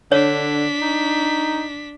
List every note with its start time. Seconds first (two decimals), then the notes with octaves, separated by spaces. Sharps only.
0.12 D3 D4 C#5 B6
0.82 D#4